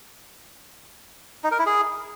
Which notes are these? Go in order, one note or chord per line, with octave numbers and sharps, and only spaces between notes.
D#4
A#4
E4
G#4